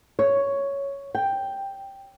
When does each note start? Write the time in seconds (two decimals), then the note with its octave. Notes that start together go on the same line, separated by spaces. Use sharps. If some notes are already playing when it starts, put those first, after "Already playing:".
0.19 C#5
1.15 G5